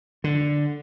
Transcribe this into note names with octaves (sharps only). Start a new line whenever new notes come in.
D3